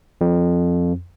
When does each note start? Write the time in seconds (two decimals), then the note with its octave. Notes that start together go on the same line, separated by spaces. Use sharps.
0.21 F2